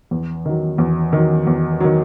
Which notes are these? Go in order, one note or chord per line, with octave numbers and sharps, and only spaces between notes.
E2
D#3 F#3
E2
D#3 F#3
E2
D#3 F#3